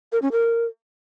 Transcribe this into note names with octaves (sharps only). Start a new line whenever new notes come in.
A#4
C#4
A#4